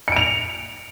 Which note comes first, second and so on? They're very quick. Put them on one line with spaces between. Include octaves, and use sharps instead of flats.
C#7 D7 F7